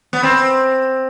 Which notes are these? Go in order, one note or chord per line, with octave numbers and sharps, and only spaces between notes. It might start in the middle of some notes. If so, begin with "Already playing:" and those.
B3
C4